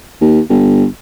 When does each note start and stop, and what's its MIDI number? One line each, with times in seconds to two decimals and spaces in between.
0.21 0.40 39
0.49 0.86 31